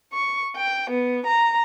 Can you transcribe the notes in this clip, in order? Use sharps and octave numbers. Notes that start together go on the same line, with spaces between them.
C#6
G5
B3
A#5